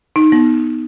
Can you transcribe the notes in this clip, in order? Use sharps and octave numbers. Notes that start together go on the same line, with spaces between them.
D#4
B3